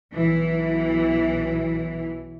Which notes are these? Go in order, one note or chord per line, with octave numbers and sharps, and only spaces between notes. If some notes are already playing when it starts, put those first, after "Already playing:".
B1 E3